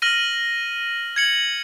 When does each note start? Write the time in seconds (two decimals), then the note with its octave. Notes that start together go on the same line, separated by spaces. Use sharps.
0.02 F6 A#6 D#7 F#7
1.16 G#6 C#7 F#7